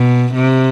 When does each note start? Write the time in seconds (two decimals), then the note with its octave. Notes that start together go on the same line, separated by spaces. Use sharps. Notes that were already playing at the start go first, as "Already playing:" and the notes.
Already playing: B2
0.34 C3